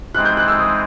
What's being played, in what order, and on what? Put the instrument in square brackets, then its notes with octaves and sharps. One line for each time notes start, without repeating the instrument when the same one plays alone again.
[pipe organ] E3 G#3 C4 D#4 [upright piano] F#6
[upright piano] G6
F#6
E6
D#6